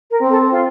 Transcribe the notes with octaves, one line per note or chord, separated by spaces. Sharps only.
A#4
C4
A4
F4